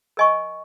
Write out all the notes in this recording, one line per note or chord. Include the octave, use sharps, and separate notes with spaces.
A#4 D#5 G#5 C#6